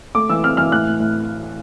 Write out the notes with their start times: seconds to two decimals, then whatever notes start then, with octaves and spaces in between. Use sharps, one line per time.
0.15 A3 D6
0.29 E3 E6
0.44 C4 F6
0.57 E3 F6
0.71 A2 F#6
0.86 A2
1.00 A2